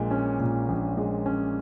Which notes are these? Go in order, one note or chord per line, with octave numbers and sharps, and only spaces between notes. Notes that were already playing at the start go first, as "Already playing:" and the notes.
Already playing: A#1 A#2 G#3
C#4
A#2
A#1
G#3
C#4